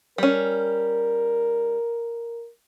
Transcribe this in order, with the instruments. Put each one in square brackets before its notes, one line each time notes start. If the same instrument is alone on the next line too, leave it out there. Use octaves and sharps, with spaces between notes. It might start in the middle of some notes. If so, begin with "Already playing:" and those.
[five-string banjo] G3 C#4 [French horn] A#4